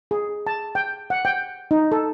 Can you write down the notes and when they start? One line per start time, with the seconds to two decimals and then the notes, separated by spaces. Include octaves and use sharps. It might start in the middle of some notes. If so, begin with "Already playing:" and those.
0.11 G#4
0.47 A5
0.75 G5
1.10 F#5
1.25 G5
1.71 D#4
1.92 A4